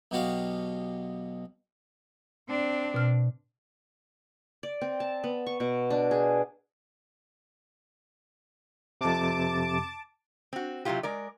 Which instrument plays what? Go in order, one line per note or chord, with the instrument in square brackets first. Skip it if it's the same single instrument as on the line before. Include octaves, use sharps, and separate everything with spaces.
[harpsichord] B1 B2 F#4 G4 F5
[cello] C4 D4
[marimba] B2 F6
[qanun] D5
C4
A5
B3
C#6
B2
D4
G#4
[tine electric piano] F2 C3 [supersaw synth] A5 D6
[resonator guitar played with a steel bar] C4 F#4
C3 F#3 A#3 E4 F4 G4
G#3 A#4 D5